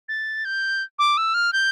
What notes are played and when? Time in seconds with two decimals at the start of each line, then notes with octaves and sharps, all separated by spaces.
0.09 A6
0.45 G6
0.99 D6
1.17 E6
1.34 F6
1.53 G6